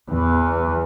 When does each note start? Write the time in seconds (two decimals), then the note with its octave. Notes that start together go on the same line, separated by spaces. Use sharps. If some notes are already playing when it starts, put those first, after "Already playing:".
0.10 E2 E3